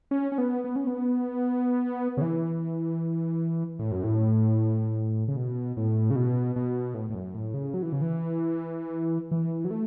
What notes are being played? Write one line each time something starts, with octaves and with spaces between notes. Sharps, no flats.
C#4
C#4
B3
B3
C#4
B3
C#3
E3
A2
F#2
A2
C#3
B2
A2
C#3
B2
B2
A2
A2
F#2
A2
C#3
F#3
E3
C#3
E3
E3
F#3
A3